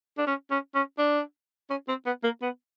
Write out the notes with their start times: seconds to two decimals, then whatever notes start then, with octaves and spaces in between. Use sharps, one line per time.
0.18 D4
0.27 C#4
0.51 C#4
0.75 C#4
0.98 D4
1.70 C#4
1.88 C4
2.06 B3
2.24 A#3
2.42 B3